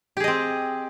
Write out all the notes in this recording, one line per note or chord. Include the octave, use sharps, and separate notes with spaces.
C4 G4 G#4 D#5